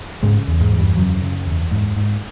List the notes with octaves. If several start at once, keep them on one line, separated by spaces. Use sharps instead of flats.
G#2 C#3 G#3
E2
G#2 G#3
E2
G2 G3
F#2 C#3 F#3
C#3
E2
G#2
G#2